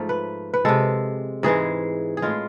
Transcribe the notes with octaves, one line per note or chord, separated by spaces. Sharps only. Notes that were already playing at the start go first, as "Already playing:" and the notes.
Already playing: G#2 F3 A3
B4
B4
C3 G#3 A4
G#2 E3 G#3 G#4
G#4
A2 G#3 F4